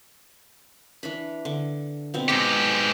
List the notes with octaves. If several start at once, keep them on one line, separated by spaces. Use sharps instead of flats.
E3 D4 B5
D3
B2 B3 C4
G#2 B3 G4 D5 D#5